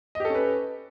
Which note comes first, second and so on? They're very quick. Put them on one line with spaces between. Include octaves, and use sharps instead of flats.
D#5 G4 A4 C#4 B4